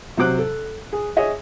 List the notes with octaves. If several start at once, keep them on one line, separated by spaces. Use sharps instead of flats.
C3 F#3 C5 D6 F#6
A4
G#4
G#4 C#5 D#5 E5